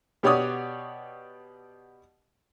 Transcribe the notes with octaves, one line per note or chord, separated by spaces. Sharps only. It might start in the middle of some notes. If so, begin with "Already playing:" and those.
B2 G4 C#5 D5 F#5 D#6